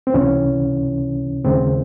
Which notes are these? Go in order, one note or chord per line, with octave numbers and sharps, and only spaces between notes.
C4
C#2 C3 E3 C#4
D#2 C#3 G#3 C4